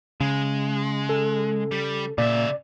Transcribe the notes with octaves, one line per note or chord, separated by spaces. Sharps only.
C#3 G#3
A4
G3
A#2 C#3 D5 E5